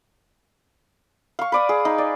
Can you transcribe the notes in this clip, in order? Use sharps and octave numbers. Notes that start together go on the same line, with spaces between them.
F5 C#6
B4 D5 D#6
G#4
D#4
D5